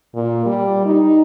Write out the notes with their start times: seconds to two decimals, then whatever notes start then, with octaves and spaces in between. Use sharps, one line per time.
0.15 A#2
0.45 G3
0.85 D#4